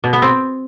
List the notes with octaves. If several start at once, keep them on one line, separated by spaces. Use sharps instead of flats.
B2
B3
C4